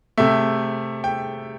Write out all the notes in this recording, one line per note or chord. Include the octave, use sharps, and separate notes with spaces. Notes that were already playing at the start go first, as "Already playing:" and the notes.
C3 A3 E5
G5